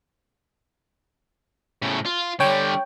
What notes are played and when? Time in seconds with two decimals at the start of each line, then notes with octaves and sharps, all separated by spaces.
1.82 A2 C#3
2.06 F4
2.40 D3 G3 C#5 G5